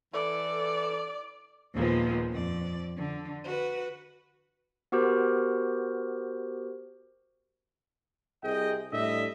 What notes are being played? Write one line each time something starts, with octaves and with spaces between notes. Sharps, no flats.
E3 E4 A4 D5
D#2 A#2 F3 G#3 B3
F2 D5
D3
F#4 B4
B3 F#4 G4 A#4 C5
C2 C3 G#4 D#5 G5
A2 G3 D4 D#5 E5